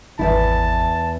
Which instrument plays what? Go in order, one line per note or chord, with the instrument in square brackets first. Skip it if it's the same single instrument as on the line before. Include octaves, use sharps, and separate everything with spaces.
[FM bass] G#1 [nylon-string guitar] E2 G#2 E4 [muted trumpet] A5